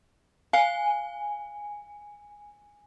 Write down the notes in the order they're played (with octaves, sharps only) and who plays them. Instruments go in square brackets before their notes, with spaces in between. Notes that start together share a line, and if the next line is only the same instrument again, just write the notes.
[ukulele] F5 [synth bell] G#5